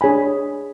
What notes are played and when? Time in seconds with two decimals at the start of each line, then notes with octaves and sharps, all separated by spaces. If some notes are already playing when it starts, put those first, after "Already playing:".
0.01 D4 G#4 C#5 G#5 B5